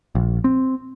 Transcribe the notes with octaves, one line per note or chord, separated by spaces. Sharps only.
A#1
C4